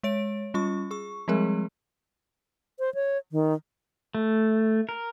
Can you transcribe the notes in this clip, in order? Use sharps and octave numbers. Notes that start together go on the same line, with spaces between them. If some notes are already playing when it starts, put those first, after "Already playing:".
G#3 C#5 D7
G3 C#4 F4 C#6
G#4 C#6
F3 G3 G#3 C4 G#4 A#4
C5
C#5
D#3
A3
A#4